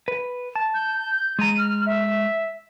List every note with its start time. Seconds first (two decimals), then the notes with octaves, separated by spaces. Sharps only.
0.08 B4
0.56 A5
0.74 G6
1.39 G#3 A#5 D#7
1.58 F6
1.86 E5